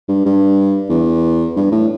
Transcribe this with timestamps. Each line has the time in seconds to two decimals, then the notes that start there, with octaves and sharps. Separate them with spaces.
0.09 G2
0.26 G2
0.90 E2
1.56 G2
1.72 A2